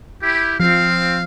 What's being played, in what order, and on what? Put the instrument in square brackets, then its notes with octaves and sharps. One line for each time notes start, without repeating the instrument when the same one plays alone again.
[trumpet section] E4 G4
[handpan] F3 [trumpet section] C4 F5